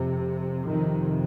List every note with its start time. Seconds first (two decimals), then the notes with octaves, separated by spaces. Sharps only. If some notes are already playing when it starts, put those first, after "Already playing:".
Already playing: F2 C3
0.66 F2 C3 D#3